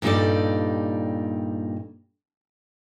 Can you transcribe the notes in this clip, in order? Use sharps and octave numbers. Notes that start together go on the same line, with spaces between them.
G2 A#2 G3 D#4 A4 D5